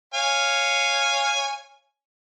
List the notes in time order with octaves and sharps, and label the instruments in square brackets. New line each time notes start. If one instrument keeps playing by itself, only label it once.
[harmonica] C#5 F5 G#5